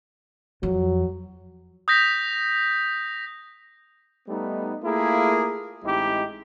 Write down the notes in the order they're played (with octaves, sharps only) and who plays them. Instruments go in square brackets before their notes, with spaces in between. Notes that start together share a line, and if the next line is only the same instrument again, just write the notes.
[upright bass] F2 [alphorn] F#3
[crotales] D#6 G6 A#6 B6
[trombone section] G3 A3 B3 D#4
A3 A#3 E4 F4 G#4 A#4
A1 G#3 C4 D#4 E4 G4